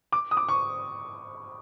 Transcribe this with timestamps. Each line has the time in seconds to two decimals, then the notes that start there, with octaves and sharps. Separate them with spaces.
0.12 D6
0.31 D#6
0.37 D6
0.49 C#6